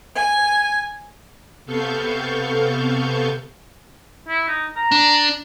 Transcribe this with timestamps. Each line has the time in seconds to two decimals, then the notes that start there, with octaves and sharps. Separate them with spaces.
0.16 G#5
1.66 C3 B3 A4 F5 C#6 G6
4.28 E4
4.48 D#4
4.76 A#5
4.92 D4